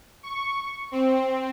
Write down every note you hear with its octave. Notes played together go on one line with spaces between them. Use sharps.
C#6
C4